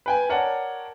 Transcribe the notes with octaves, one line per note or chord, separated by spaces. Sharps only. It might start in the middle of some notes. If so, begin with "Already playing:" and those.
B4 G5 G#5
A#4 C#5 D5 F#5 G5 A5